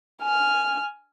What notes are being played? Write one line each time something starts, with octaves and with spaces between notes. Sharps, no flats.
G#5 F6